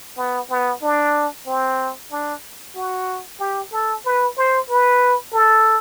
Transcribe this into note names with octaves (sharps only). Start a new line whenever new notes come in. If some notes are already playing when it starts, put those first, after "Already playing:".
B3
B3
D4
C4
D4
F#4
G4
A4
B4
C5
B4
A4